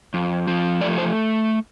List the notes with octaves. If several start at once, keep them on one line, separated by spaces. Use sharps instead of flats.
F2
F3
A3 D5
C5